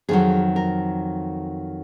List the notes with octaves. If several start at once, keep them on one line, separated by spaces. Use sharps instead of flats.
F2 D#3 F#3 G#4
A#4